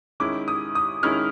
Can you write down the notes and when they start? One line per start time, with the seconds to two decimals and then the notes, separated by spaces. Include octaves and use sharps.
0.20 D#3 G#3 C#4 E4 D6
0.48 D#6
0.75 D#6
1.03 D#3 G#3 C#4 E4 F6